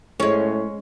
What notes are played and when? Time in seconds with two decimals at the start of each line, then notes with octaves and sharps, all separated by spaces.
0.20 A2 G#3 C#4